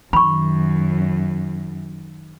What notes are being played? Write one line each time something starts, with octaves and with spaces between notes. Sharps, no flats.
F#2 D#3 B5 C#6